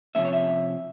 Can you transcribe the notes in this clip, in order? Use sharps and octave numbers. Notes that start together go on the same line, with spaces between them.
C3 F3 G#3 C#4 E5
C#5
E5